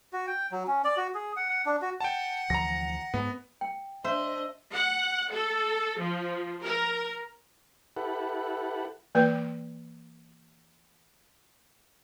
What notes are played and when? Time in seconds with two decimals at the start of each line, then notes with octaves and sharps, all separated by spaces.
0.13 F#4
0.27 G5
0.51 F#3
0.67 C#4
0.84 D5
0.97 F#4
1.14 G#4
1.36 F#5
1.50 F#5
1.66 D4
1.82 F#4
2.00 F#5 G5 A5
2.50 D2 E3 F3 A#5 A#6
3.14 G#2 B3
3.61 G5
4.04 D4 C5 D#5 E5
4.73 F#5
5.33 A4
6.00 F3
6.63 A#4
7.97 E4 G4 A4 B4 F#5
9.15 E3 A#3 B4 G5